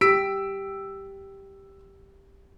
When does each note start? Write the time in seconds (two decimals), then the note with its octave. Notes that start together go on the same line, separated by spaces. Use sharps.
0.01 G4 E6 B6 D7